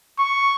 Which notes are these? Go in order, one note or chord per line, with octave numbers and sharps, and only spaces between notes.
C#6